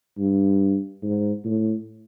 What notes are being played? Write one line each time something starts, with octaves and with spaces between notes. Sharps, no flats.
G2
G#2
A2